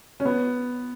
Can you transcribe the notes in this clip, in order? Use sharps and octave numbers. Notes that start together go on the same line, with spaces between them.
C#4
B3